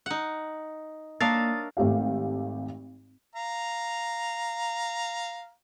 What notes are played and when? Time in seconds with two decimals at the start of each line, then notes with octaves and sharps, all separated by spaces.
0.06 D#4 F#5
1.21 A#3 D4 A#4 C#5 E5 F5 D#6 A6
1.77 G#1 A3 G4 F5
3.35 F5 A#5